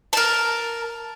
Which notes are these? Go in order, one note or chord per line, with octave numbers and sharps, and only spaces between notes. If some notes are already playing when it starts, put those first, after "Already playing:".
A#4 A5